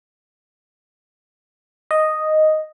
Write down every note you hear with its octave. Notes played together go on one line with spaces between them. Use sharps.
D#5